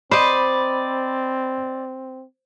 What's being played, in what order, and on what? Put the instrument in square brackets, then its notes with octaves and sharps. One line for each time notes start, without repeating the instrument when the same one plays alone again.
[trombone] C4 [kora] C5 [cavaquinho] D5 D#5 [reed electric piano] B5